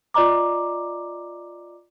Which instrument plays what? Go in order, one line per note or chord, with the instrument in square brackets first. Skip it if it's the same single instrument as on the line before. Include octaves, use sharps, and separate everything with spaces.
[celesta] F4 D5 D#5 A#5 D6